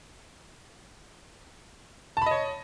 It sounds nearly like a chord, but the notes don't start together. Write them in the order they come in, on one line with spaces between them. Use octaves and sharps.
A5 B5 D#5 C#5